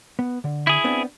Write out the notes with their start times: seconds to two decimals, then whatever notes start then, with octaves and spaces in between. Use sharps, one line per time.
0.19 B3
0.44 D3
0.67 E4 G#4
0.84 B3 C4 D4